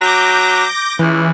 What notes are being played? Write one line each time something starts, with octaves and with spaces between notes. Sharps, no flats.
F#3 D6 G6 A#6
C#2 E3